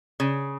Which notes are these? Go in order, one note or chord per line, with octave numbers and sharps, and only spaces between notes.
C#3